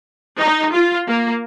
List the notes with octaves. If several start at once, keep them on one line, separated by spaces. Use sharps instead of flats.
D#4
F4
A#3